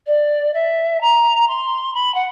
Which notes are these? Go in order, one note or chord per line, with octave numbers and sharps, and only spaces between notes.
D5
E5
A#5
C6
B5
F#5